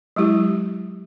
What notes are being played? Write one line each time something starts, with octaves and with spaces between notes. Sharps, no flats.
F#3 G#3 E4 G4